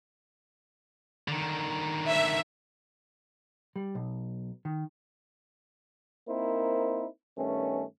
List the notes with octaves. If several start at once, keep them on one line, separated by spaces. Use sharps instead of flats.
D3 D#3
E5
G3
B1
D#3
A#3 C4 D#4 E4 A#4 C5
G2 D#3 A3 B3 C#4